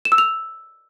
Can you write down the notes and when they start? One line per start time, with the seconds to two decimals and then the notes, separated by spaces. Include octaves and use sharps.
0.05 E7
0.12 E6
0.18 F7